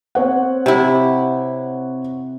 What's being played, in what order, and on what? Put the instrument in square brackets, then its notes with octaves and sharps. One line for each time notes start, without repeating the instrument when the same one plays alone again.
[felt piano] C4 C#5 F#5
[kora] C3 E4